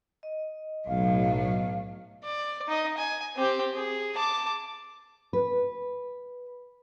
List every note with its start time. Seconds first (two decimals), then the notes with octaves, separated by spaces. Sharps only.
0.23 D#5
0.88 B1 A2 F#3 F5
2.24 D5
2.68 D#4 D#5
2.97 G#5
3.36 C4 G4
3.74 G#4
4.16 A5 D6
5.33 B4